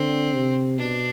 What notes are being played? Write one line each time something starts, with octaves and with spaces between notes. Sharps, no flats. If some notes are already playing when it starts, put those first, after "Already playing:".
Already playing: D3 C4
C3
B2 D4